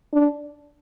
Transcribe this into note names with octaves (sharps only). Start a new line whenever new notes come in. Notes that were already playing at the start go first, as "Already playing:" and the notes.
D4